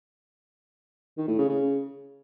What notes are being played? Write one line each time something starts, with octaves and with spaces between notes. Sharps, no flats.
D#3
A2
C#3
C#3